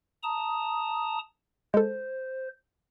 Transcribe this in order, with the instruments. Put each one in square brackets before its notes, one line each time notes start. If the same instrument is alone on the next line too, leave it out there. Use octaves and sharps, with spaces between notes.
[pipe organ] A5 A#5 D#6
[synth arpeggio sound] G#3 A4 [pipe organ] C5